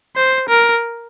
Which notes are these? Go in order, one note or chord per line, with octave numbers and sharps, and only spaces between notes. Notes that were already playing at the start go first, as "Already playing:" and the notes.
C5
A#4